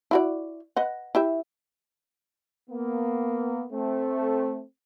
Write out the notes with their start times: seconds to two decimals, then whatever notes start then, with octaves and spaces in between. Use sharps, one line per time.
0.11 E4 F#4 D5
0.76 B4 D#5 F#5
1.15 E4 G4 E5
2.70 A#3 B3
3.72 A3 C4